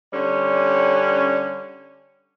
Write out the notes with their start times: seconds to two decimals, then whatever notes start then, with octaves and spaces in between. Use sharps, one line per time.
0.12 D3 G3 C#4